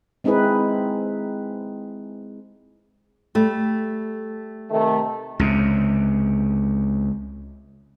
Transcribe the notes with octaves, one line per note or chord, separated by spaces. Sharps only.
G#3 C4 D#4 E4 G#4 B4
G3 A3
C3 D#3 A3
C#2 C3